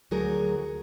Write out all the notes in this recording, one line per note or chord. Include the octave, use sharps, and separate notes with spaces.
D2 F#3 F#4 G#4 A#4